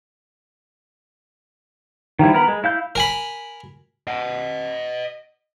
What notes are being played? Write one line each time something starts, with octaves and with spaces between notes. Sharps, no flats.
D#3 F3 G3 E4
B3 A#4 B5
G#3
E4 F5 G6
A#4 G#5 B5
D#5 F#5